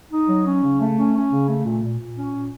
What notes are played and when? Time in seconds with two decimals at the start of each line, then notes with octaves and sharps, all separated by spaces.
0.11 D#4
0.28 F#3
0.45 C#4
0.63 C#3
0.80 A3
0.97 C#4
1.14 C#4
1.30 C#3
1.48 A3
1.65 A#2
1.83 A#2
1.99 A#2
2.16 C#4
2.33 A#2